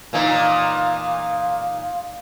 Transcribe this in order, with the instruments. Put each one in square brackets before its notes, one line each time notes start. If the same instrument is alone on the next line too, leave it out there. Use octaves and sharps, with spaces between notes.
[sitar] A#2 E3 D#4 [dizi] F5